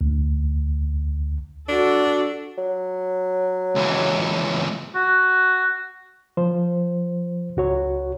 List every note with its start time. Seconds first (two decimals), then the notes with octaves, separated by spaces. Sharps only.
0.01 D2
1.69 D4 F#4 A4
2.58 F#3
3.75 C#2 E3
4.95 F#4
6.37 F3 C5
7.57 C#2 F#4 C#5